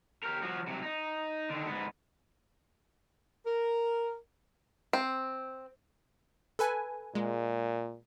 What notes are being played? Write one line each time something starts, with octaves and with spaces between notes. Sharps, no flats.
G4 A#4
F3 F#4
C3 F#3
D#4
D3 D#3
G#2 B3
A#4
C4
A4 B4 G#5
A#2 G#3